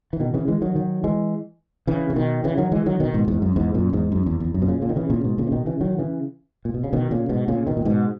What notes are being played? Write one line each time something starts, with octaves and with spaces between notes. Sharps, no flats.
E3
B2 D#3
C#3 E3
E3 G#3
D#3 F#3
D#3 F#3
E3 G#3
C#3 E3
C#3
B2 D#3
C#3 E3
D#3 F#3
E3 G#3
D#3 F#3
B2 D#3
G#2 B2
E2 G#2
F#2
E2 G#2
F#2 A#2
E2 G#2
F#2
E2
E2
F#2
B2
A#2 C#3
A#2 C#3
D#3
C#3 E3
A#2 C#3
G#2 B2
A#2 C#3
E3
B2 D#3
C#3 E3
D#3 F#3
C#3 E3
A#2
B2
C#3
B2 D#3
A#2 C#3
G#2 B2
A#2 C#3
B2 D#3
A#2
G#2 B2